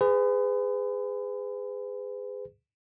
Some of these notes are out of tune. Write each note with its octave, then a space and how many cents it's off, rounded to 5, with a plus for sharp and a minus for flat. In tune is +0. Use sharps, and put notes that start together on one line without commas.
G#4 -15 B4 +40